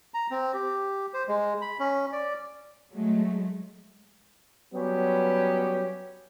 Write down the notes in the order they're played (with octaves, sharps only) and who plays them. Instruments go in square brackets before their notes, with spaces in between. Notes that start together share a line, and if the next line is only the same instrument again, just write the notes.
[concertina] A#5
C4
G4
C5
G#3
B5
C#4
D5
[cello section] F#3 G#3 A3
[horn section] F#3 G3 B3 C#4 G4